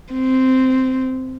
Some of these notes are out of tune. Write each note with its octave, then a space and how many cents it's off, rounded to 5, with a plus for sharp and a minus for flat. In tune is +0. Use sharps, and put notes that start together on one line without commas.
C4 -10